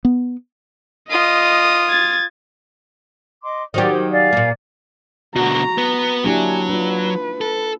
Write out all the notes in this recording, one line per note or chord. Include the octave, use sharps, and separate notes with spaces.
B3
F4 D#5 D#6
G#6 A6
D#5 C6 D6
D#3 F#3 G4 C5 D5
C5
D5 F5 G#5
A#2 A#3
B2 D3 F#4 A#5
B3
F#3 A#3 D4 E4 G4 G#5
D4 F4 B4
A4